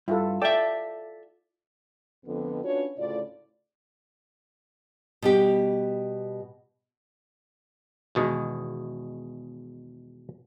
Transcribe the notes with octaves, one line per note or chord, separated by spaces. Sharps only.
G2 E4 F4 A4
A4 D5 E5 G5 D6
F2 D3 B3
C#4 D4 F4 F#4 B4 C#5
D2 A2 C#3 F4 D5
B2 G3 G4
E2 B2 D#3 G#3